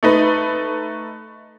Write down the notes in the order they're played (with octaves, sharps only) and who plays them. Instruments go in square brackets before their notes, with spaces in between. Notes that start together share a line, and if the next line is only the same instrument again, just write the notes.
[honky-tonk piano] A3 D#4 B4